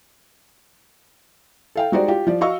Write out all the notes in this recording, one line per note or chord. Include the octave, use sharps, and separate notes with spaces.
A4 F5 G5
G#3 D#4 F#4 G4 C5 D5
F4 G4
F3 D5
F#4 D#5 F5 C#6 E6